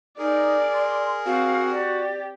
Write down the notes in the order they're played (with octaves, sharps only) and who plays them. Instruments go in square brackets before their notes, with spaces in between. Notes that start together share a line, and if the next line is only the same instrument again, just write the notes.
[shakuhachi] D#4 [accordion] G#4 A#4 [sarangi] D5
[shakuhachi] C6
[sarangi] C4 [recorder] F#4 [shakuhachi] F5
[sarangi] G4 [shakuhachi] D5